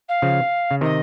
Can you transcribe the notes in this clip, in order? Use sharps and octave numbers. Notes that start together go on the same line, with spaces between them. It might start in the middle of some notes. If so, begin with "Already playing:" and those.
F5
C#3 F3
C#3
C3 D#3 D#5